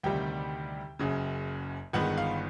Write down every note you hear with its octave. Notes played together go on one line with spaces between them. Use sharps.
D2 C3 D#3 G3 G5
F#1 F#2 C#3
G1 G2 D#3 G#3 B3 F#5
F5